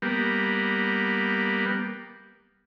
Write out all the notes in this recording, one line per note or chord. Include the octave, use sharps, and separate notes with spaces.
G3 A#3 B3